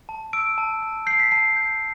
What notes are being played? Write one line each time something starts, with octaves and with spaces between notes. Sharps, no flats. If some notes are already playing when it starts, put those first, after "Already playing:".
A5
E6 D7
A5
A5
G6 C7
B6
A5 C7
G6